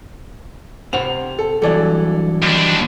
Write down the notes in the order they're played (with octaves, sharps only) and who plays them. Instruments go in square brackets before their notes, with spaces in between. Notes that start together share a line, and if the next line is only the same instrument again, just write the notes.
[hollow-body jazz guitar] C3 C5 F#5 [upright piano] F7
[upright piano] A4
[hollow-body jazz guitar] G2 E3 F#3 [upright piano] A4 D5
[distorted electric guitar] D#2 D4